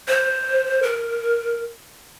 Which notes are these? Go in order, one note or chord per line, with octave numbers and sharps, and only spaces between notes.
C5
A#4